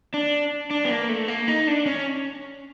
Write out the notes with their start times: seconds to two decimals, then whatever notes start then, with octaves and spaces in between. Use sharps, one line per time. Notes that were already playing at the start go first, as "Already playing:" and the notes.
0.14 D4
0.71 D4
0.85 B3
0.90 A#3
1.09 A3
1.28 A#3
1.48 D#4
1.68 D4
1.86 C#4